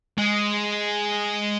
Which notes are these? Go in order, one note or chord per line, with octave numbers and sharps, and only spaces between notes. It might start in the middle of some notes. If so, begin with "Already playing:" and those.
G#3